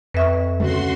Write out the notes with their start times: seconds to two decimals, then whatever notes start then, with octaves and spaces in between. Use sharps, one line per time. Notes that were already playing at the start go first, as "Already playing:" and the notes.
0.14 F2 B4 E5 C#6
0.60 D2 C#3 A3 F#4 C6